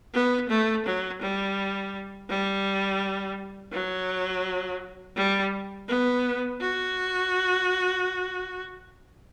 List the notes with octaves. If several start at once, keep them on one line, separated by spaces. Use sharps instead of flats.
B3
A3
F#3
G3
G3
F#3
G3
B3
F#4